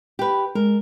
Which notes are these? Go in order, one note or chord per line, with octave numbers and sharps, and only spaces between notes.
G4 B4
G#3 A#4